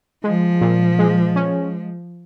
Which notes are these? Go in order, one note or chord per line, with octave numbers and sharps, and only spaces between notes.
F3 G#3
A#2
G#3
C#4